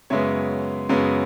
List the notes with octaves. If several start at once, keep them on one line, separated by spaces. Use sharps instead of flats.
F#2 C#3 G#3 B3 C#5 E5
F#2 C#3 G#3 B3